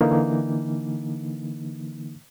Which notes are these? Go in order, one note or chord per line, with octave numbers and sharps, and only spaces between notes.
D3 E3 A#3 D#4